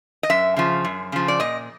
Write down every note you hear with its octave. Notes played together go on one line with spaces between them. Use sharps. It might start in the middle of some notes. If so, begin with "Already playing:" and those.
D#5
F#2 E5
C#3 F3
F#2
C#3 F3
D5
A#2 D#5